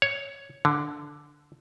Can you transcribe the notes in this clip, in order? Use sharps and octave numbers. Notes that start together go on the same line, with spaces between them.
C#5
D3